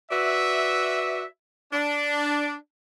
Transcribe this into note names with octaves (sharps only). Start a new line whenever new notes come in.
F#4 B4 D5 E5
D4